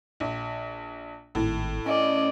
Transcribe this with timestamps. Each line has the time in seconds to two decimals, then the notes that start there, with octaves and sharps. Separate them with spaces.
0.20 A#1
1.35 G#1 A2
1.86 C#4 D5 D#5